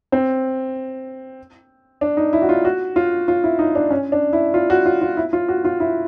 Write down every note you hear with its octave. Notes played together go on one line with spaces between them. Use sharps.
C4
D4
D#4
E4
F#4
F4
F#4
F4
F4
E4
D#4
D4
C#4
D4
E4
F4
F#4
F4
F4
E4
F4
F#4
F4
E4